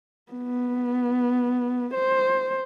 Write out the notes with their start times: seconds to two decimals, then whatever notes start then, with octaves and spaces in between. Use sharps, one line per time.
0.32 B3
1.95 C5